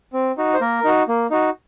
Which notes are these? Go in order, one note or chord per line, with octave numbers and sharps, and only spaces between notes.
C4
D#4 F#4
C5
A#3 A#4
D#4 F#4
A#3
D#4 F#4